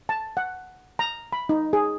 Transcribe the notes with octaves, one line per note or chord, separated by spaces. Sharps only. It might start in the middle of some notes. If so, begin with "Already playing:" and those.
A5
F#5
A#5
B5
D#4
G#4